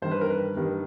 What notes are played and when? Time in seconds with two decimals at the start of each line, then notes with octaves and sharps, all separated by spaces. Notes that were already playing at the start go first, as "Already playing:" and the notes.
0.02 G2 D#3 G3 C5
0.11 B4
0.21 A#4
0.30 B4
0.56 G2 D#3 G3